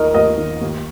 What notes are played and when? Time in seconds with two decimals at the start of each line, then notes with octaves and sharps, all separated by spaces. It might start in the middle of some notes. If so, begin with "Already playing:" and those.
Already playing: D#2 D#3 A#4 D#5
0.14 D#2 A#4 D#5
0.38 D#3
0.61 D#2